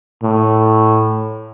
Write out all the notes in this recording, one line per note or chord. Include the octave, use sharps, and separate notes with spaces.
A2